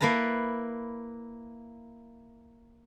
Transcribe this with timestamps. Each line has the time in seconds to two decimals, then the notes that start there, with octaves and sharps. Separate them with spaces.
0.01 A#3 E4 B4 A5 A#5